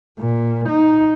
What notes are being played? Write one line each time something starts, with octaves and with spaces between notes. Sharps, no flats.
A#2
D#4